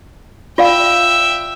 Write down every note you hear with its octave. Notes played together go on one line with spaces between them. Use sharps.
F4 D5 E5 F5 G5